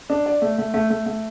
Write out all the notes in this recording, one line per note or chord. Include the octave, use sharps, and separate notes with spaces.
D4
D5
A3
A3
A3
A3
A3